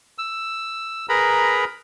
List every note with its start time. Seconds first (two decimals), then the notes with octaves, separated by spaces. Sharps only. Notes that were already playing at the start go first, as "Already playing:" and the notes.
0.18 E6
1.09 G#4 A#4 B4 A#5 B5